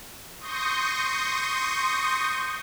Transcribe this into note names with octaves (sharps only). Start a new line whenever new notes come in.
C6 C#6 D#6 G6 A#6